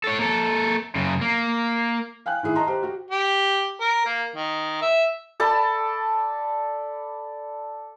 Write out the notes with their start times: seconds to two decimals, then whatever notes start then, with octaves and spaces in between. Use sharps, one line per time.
0.04 A4 C#5
0.19 A#3 A4
0.95 F#2 C#3
1.21 A#3
2.26 F5 G5 G#5 F#6
2.43 A2 D#3 E4 G#4
2.55 D#5 A5 A#5 C6
2.67 G4 C5 A#5
2.83 F#4 G4
3.11 G4
3.80 A#4
4.05 A#3
4.36 D#3
4.81 E5
5.40 A4 D5 A5 B5